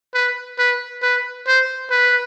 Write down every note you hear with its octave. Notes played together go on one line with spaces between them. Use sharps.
B4
B4
B4
C5
B4